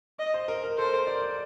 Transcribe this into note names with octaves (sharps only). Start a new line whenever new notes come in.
D#5
C5
A#4
A#4
A4 C5
A#4
D5
D5